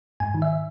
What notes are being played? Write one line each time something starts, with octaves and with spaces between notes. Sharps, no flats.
G#2 G#5
D#3
E5